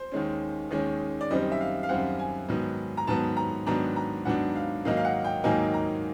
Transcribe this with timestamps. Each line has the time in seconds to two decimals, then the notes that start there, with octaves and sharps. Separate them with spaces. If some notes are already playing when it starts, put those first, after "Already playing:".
Already playing: C5
0.12 D#2 D#3 G#3 C#4
0.71 D#2 D#3 G#3 C#4
1.21 D5
1.30 F#2 D#3 G3 C4 D#5
1.52 E5
1.60 F5
1.83 F5
1.89 F#2 D#3 G3 C4 F#5
2.19 G#5
2.49 G#2 D#3 F#3 B3
2.97 A#5
3.07 G#2 D#3 F#3 B3 A5
3.37 A#5
3.66 G#2 D#3 F#3 B3 D4 A#5
3.96 A#5
4.25 G#2 D#3 F#3 B3 D4 F#5
4.55 F5
4.85 G#2 D#3 F#3 A#3 D#4 F5
4.97 F5
5.05 F#5
5.24 G5
5.44 G#2 D#3 F#3 A#3 D#4 G#5
5.74 A#5